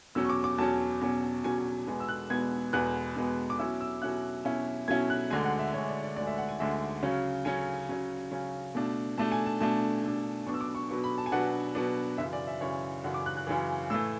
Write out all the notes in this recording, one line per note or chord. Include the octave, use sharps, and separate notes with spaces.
E2 B2 F#3 C#4 E6
C#6
D6
D6
E2 B2 F#3 C#4 A5
E2 B2 F#3 C#4
E2 B2 F#3 C#4 G#5
G#5
E2 B2 G#3 B3
E6
F#6
E2 B2 G#3 B3 G#6
E2 B2 G#3 B3 F#6
E2 B2 G#3 B3
D6
B2 F#3 C#4 E4 E6
E6
B2 F#3 C#4 E4 F#6
B2 F#3 C#4 E4
B2 F#3 C#4 E4 G#6
F#6
D2 D3 G#3 G#5
F#5
E5
D2 D3 G#3 C#5
E5
D5
D5
D2 D3 G#3 D5
E5
F#5
G#5
D2 D3 G#3 E5
C#3 F#3 C#4
C#3 F#3 C#4 G#5
C#3 F#3 C#4
C#3 F#3 C#4
B2 A3 D4
B2 A3 D4 A5
G#5
A5
B2 A3 D4 A5
B2 A3 D4
B2 F#3 B3 D4 C#6
E6
D6
C#6
B2 F#3 B3 D4 C#6
B5
A5
G#5
B2 F#3 B3 D4 F#5
B2 F#3 B3 D4
F#2 C#3 E3 E5
D5
E5
F#2 C#3 E3 C#5
F#2 C#3 E3 F#5
D6
F#6
F#6
F#2 C#3 E3
A2 E3 A3 E6